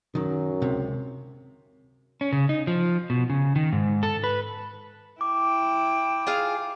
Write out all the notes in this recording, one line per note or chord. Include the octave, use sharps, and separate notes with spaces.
F#2 D#3 F#3
C#2 C3
C#4
C#3
D#4
F3
B2
C#3
D#3
G#2
A4
B4
E4 G5 D6
F4 G#4 F5